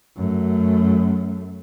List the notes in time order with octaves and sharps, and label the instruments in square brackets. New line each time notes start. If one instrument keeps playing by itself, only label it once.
[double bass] F#2 A3